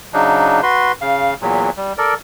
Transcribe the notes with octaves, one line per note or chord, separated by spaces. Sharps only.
C#3 F#3 D4 D#4
F#4 B4 C6
C#3 F5
E2 A#2 F#3
G3
A4 A#4 D5